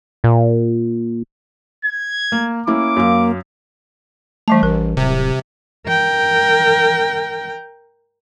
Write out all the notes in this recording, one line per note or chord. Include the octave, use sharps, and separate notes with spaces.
A#2
G#6
A#3
A#3 C#4 E4 D6
F#2 A#3 F5
E3 G3 A3 A5
A1 A#4
D1 C3
A#4 G5